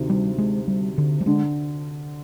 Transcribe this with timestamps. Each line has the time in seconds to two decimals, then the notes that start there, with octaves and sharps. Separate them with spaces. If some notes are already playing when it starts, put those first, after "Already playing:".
Already playing: D2 C3 D#3
0.09 G3
0.38 G#3
0.68 G3
0.98 D3
1.21 G3
1.26 D3 G#3